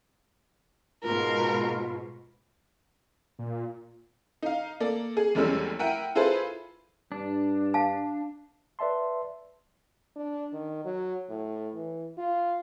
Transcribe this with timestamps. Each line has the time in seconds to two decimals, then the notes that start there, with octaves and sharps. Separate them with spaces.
1.04 G#2 B2 F4 A#4
3.39 A#2
4.42 D#4 F5
4.80 A#3 A4 D5
5.17 G#4
5.35 F1 E2 G3 G#3 C#4 E6
5.79 E4 A#4 E5 F#5 G5 D#7
6.15 E4 F4 G#4 A4 B4 C5
7.12 G2 D4
7.74 F5 A5
8.79 B4 D5 E5 A5 C6
10.16 D4
10.53 D#3
10.85 F#3
11.30 A2
11.75 E3
12.18 F4